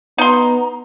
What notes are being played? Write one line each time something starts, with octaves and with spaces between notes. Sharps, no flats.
B3 D#4 A#5 C6